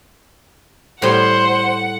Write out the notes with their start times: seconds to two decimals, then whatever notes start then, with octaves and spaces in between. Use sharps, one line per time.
1.02 A2 G3 C5 F#5